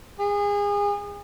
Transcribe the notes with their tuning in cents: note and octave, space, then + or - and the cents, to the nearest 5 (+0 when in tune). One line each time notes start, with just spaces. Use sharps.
G#4 -30